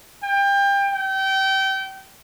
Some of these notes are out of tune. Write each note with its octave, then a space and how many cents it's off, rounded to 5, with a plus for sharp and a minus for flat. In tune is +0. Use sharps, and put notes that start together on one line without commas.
G5 +25
G5 -25